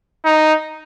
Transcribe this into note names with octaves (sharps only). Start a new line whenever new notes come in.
D#4